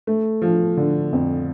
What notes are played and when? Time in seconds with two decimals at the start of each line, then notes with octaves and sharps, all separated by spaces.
0.07 A3
0.42 F3
0.77 D3
1.13 F2